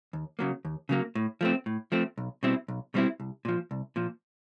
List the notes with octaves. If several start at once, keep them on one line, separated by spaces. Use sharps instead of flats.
D#2
C#3 F#3 A#3
D#2
C#3 F#3 A#3
A2
F3 A3 C4
A2
F3 A3 C4
B1
B2 G3 C4 E4
B1
B2 G3 C4 E4
C2
A#2 F3
C2
A#2 F3